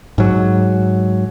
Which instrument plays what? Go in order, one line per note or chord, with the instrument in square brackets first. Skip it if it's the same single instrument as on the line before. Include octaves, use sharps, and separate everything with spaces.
[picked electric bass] G#2 F#3